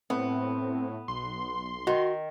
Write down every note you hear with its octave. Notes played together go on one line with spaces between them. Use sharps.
A2 B3 C4
B1 C6
D#3 F#4